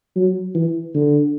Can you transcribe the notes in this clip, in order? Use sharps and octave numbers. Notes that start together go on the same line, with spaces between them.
F#3
E3
D3